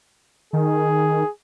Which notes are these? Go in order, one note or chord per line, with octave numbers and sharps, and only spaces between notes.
D#3 G#4